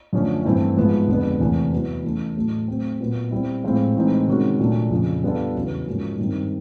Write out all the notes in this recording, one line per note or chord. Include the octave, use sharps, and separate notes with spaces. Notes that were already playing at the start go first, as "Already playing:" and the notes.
F#2 D3 F3 A3 C#4
G2 E3 A3 C4 E4
G#2 F3 G#3 B3 E4
F2 D3 F3 G#3 B3
E2 C3 E3 A3
F#3 B3 E4
E3 A3 C#4
A2 F#3 A3
F#3 A3 C4
A#2 F#3 B3
G3 C4 E4
A2 F3 G#3 C4 F4
A2 E3 G#3 C4 D#4
C3 D#3 G#3 C#4 F#4
A#2 F#3 A3 D4
F2 C#3 F3
G3 B3 D4 F4 A4
E2 C#3 F#3 B3 E4
G#2 F3 A#3 C#4 F#4
G2 D#3 G3 C4